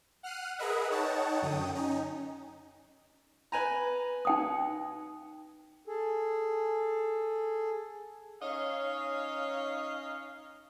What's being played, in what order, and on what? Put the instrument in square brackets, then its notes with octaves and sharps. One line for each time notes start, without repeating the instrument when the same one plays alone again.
[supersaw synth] F#5 F6 F#6 C7 D#7
G#4 A#4 B4 D#5 E5 F#5
D#4 C#5 D#5 F#5 G5 A5
F#2 D3 G5 D#6
C#4 D#4
[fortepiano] B4 G#5 A#5
[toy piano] D#4 G5 D#6
[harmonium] G#4 A4
[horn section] C#4 D#4 C#5 D#5 F5